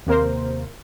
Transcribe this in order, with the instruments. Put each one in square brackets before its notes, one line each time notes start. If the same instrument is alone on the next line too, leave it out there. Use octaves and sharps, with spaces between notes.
[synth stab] D#2 C3 A#3 A#4 C5